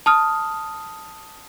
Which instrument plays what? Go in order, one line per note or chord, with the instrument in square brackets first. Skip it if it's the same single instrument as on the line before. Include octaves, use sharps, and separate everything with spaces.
[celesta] A5 D#6 F6